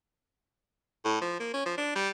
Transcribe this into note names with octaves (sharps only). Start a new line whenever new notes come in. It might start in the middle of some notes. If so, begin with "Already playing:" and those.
A2
F3
A#3
C#4
F3
D4
G3